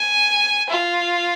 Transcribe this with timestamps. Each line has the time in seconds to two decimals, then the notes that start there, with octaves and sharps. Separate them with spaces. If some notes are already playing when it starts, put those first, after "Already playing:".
Already playing: G#5
0.69 F4